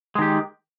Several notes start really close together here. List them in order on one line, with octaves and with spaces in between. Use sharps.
G#3 D#3 G4